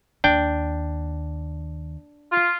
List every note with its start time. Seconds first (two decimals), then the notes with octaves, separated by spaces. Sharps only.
0.24 D#2 D4 G5
2.32 F4